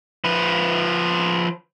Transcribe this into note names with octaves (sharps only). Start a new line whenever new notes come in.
F3 B4